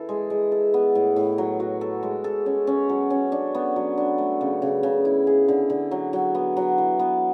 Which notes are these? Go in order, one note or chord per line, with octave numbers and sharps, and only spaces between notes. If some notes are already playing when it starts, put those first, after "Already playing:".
Already playing: E3 E4 A4
G#3
G#3
A4
B3
A2
A2
F#3
F#4
A4
G#3
A4
C#4
C#4
F#3
C#4
D4
B3
F#3
D4
A3
C#3
C#3
C#3
E4
G#4
D3
D3
F#3
F#3
B3
F#3
E3
B3